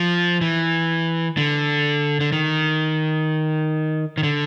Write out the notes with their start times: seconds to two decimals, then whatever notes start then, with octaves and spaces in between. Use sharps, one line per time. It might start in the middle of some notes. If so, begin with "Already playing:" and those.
Already playing: F3
0.41 E3
1.37 D3
2.21 D3
2.32 D#3
4.18 D#3
4.23 D3